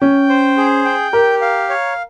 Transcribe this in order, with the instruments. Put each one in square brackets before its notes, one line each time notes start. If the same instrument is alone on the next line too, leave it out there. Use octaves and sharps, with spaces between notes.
[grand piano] C#4 [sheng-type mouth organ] G5
[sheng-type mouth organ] C5
G#4
G5
[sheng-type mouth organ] G4 [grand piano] A#4
[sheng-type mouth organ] F5
C#5